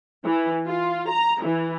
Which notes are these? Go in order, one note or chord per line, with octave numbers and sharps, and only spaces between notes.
E3
F4
A#5
E3